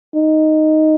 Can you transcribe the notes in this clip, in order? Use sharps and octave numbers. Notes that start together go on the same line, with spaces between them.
D#4